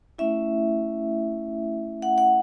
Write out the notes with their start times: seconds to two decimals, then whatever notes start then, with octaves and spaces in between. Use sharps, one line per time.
0.18 A3 C#4 E4 E5
2.02 F#5
2.18 F#5